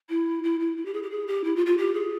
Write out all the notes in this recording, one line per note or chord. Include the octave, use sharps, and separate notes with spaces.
E4
E4
E4
E4
G4
G#4
G4
G#4
G4
E4
F4
F4
G4
G#4